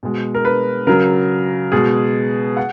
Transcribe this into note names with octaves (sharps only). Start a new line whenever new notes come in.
B2 G#3
A#4
B4
C#3 F#3 A#4
B2 G#3 G#4
F#5